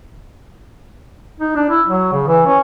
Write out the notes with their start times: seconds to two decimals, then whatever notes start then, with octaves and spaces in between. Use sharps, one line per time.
1.40 D#4
1.55 D4
1.69 E4
1.87 F#3
2.13 C#3
2.27 E3
2.47 C#4